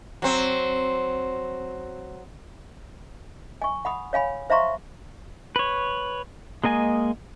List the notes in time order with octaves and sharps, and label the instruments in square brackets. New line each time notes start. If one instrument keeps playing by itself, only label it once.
[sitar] F#3 C4
[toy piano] G#5 C#6
F#5 B5 D#6
C#5 F5 G#5 B5
C5 E5 F5 A#5 C6 C#6
[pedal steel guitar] B4 C#5
G#3 A#3 D#5 G#5